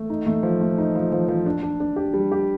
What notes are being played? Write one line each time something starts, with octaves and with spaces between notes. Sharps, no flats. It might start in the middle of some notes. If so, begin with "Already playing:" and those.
Already playing: A3
D#4
A3
F3
A3
D#4
F3
F3
F3
D4
D4
D4
G4
G3
G4